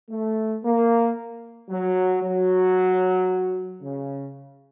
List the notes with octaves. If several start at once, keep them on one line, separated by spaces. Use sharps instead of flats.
A3
A#3
F#3
F#3
C#3